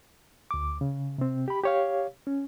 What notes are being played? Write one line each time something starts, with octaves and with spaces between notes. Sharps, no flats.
D2 D6
C#3
C3 C4
G4 B5
G4 C#5 F5
C#4